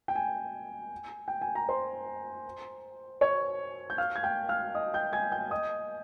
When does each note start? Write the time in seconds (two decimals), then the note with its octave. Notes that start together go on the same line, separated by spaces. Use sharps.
0.08 G5
0.15 G#5
1.28 G5
1.41 G#5
1.55 A#5
1.69 C5 C6
3.21 C#5 C#6
3.90 G6
3.98 F5 F6
4.16 G#6
4.23 G5 G6
4.49 F5 F6
4.75 D#5 D#6
4.94 G5 G6
5.12 G#5 G#6
5.32 G5 G6
5.51 D#5 D#6